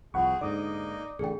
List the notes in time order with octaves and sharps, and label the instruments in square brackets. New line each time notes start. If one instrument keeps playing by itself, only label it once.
[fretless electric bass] C2 F3 [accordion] C4 G#4 [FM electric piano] F#5 B5 C#6
[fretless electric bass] G#2 D3 [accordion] A#3 D#4 [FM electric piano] D5 D6 D#6
[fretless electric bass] A1 D3 [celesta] G#4 G5